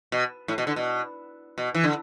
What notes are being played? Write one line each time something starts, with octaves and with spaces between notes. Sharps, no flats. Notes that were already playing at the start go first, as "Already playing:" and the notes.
B2
A2
B2
D3
B2
B2
E3
D3